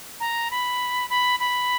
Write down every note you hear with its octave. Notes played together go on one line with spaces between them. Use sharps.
A#5
B5
B5
B5